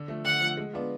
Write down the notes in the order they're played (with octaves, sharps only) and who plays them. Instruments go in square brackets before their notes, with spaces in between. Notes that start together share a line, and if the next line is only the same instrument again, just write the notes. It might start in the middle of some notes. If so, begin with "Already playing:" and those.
Already playing: [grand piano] D3
F3 A3
[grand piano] D3 [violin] F#5
[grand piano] F3 A3
G#3
B3 D4 F4